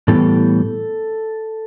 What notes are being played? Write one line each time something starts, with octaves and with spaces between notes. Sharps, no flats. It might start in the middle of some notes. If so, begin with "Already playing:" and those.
A2 E3 G3 B3 A4